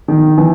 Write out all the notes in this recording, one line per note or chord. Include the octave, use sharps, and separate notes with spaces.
D#3
E3